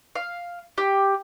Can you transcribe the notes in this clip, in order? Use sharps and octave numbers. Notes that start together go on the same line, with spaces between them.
F5
G4